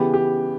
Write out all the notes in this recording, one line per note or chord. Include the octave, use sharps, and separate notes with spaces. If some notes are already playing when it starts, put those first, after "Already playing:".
Already playing: C#3 E3 B3 G4
G4